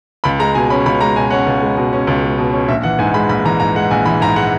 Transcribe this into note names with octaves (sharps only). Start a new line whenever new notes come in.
C#2 B5
G#3 A#5
B2 G#5
C#4 B5
C#2 B5
G#3 A#5
B2 G#5
C#4 F#5
C#2
G#3
B2
C#4
C#2
G#3
B2
C#4
A#1 E5
E3 F#5
G#2 G#5
G#3 B5
A#1 B5
E3 A#5
G#2 A#5
G#3 F#5
A#1 G#5
E3 B5
G#2 A#5
G#3 F#5